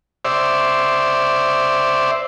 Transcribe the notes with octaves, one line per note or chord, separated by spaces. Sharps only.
C5 D5 E5